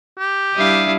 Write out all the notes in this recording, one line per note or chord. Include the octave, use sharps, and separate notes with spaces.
G4
G3 D4 E4 F5 D#6